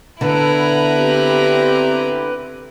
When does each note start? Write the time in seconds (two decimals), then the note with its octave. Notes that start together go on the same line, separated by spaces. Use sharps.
0.21 D3 B3 E4 B4 A#5
0.93 C4 G4